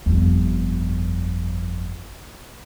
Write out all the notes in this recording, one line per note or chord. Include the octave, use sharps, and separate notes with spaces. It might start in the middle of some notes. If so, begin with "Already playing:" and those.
G1 F2